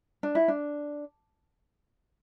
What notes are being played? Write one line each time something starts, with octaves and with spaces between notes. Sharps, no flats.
D4
E4
D4